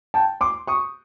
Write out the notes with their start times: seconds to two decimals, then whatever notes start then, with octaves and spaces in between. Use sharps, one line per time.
0.14 G5 A5
0.41 C6 D6
0.67 C#6 D#6